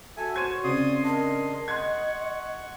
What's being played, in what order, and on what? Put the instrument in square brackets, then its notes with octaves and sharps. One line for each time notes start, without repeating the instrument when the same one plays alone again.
[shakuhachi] F#4 [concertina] A4 E5 G#5
[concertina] C5 C#5 C#6 [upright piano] G#6 D#7
[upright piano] C#3 C4 [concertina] D5 C6 D#6
[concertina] D4 D#5 C6 [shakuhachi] A#4
[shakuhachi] D#5 [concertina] F#5 C#6 [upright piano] C6 G#6